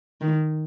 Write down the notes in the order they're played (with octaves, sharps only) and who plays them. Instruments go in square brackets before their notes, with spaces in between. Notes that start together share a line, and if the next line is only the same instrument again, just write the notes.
[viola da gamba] D#3